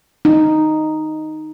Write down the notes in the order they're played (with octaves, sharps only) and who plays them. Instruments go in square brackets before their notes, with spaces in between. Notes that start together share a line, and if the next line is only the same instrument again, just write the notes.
[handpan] D#4